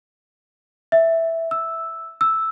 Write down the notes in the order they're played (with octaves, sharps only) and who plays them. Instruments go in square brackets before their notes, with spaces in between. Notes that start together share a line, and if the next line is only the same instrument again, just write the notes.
[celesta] E5
E6
E6